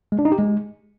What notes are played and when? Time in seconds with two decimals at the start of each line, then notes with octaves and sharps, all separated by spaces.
0.12 G#3
0.19 D4
0.25 D#4
0.32 G4
0.38 G#3